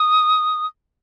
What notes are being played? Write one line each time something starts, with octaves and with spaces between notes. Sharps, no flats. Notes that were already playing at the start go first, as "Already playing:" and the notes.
Already playing: D#6